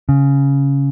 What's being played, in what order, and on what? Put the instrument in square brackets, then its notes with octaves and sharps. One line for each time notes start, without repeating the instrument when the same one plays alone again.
[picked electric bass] C#3